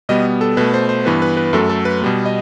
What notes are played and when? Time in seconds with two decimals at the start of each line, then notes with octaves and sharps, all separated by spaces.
0.09 B2 G3 B3 D#5
0.41 A4
0.57 B2 A3 B4
0.74 C5
0.89 C5
1.05 G2 E3 B3 B4
1.22 B4
1.37 B4
1.53 F#2 F#3 A3 A4
1.69 A4
1.85 B4
2.01 B2 G3 B3
2.26 D#5